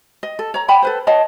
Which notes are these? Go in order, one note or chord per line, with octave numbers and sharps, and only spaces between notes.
D#5
A4
C#5 A#5
F#5 G5 B5
A4 B4 C5
C#5 D#5 F#5 A5